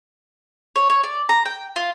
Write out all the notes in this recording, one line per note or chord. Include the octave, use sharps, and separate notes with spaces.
C#5
C#5
D5
A#5
G5
F4